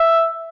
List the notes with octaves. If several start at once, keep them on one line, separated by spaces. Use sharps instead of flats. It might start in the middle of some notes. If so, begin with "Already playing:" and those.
Already playing: E5